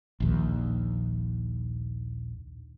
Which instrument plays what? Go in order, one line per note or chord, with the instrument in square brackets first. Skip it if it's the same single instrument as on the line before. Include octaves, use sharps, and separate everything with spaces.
[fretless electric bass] A#1 D#2